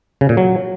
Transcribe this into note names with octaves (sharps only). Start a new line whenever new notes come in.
C#3
A#2
F#3